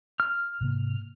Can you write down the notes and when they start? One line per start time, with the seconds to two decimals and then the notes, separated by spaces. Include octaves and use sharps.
0.20 F6
0.61 G#2 C3 A#3